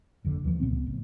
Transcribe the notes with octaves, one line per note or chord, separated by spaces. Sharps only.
F#1 F2 D3
D#2 E3 F3
C#2 A#2 B3 C4
A1